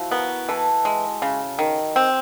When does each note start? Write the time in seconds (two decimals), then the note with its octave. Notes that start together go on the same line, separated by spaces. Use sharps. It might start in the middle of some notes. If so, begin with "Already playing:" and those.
Already playing: F3 E4 F#4
0.11 B3 A#4
0.49 E3 A4
0.85 G#3
1.22 C#3
1.59 D#3
1.96 C4